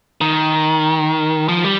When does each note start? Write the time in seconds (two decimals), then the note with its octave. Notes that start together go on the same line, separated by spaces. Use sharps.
0.21 D#3
1.49 F3
1.64 G3